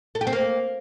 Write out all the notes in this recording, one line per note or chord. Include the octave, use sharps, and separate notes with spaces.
A4
G4
C4
A#3